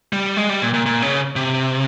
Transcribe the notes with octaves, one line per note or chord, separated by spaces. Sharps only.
G3
G#3
G3
A#2
A#2
A#2
C#3
C3